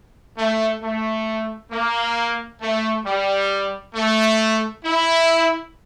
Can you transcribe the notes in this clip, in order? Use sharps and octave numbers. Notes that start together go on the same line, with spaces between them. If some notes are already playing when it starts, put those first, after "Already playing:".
A3
A3
A#3
A3
G3
A3
E4